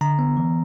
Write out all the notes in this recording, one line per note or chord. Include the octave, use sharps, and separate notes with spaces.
D3 A#5
B3
E3